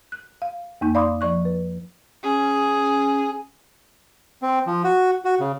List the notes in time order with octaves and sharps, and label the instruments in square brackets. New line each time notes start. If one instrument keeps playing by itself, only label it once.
[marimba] F#6
F5
F2 A#3 D#4 G6
D5 F5 B5 C6 D6 D#6
F3 D5 C#6 F#6
B4
[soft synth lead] C#4 [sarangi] G#4
[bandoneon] C4
F3
F#4
F#4
C#3